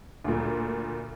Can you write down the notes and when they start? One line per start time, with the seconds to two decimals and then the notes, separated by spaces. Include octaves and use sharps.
0.24 D2 A#2